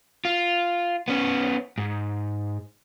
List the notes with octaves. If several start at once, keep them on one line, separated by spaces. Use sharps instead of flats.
F4
B3 C#4
G#2